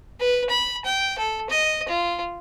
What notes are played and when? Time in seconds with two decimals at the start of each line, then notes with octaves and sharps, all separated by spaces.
0.20 B4
0.50 B5
0.85 G5
1.18 A4
1.50 D#5
1.89 F4